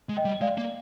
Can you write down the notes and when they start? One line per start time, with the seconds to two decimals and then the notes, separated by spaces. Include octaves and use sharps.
0.09 G#3
0.17 D#5 G5
0.25 G3
0.41 G#3 D5 F5
0.58 A#3